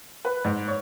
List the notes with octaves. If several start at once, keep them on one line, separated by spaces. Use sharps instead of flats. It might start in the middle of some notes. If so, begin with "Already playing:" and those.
B4
G#2
C#5